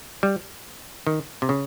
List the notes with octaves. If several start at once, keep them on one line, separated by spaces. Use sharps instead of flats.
G3
D#3
C3
C#3